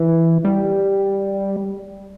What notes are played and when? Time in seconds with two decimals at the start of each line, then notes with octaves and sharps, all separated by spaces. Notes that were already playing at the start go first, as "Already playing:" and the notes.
Already playing: E3
0.45 G3